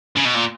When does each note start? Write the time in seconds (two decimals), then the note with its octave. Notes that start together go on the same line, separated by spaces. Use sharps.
0.17 C#3
0.25 B2
0.35 A#2